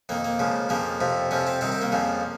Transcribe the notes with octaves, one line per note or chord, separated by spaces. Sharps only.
F2 D#3 A#3
A#3
C#2 C#3 F3
F2 C#3 F3 A#3
F2 C3 F3
F2 C3 F3 C#4
C4
C2 C3 D#3 C4
C4
A#3
F2 C#3 F3